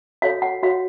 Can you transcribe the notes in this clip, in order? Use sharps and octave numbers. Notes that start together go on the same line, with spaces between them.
F#4 A4 C#5 F5
F#5
F#4 C#5 F5